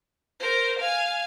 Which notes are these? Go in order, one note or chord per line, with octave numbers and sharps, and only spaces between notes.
A#4 C5
F5 G#5